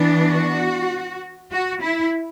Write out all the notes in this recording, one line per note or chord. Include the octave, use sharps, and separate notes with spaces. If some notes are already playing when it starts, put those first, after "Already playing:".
Already playing: E3 B3 D4
F#4
F#4
E4